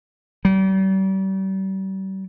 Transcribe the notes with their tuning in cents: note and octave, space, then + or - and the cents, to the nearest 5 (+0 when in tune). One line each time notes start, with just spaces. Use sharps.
G3 -40